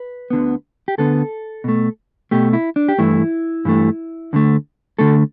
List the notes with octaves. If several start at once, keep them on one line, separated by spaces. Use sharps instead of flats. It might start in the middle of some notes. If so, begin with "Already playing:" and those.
Already playing: B4
D2 D3 B3
G4
D2 D3 B3 A4
B2 A3
B2 A3 G4
E4
D4
G4
G2 E3 A3 E4
G2 E3 A3
D2 D3 A3
D2 D3 A3 A4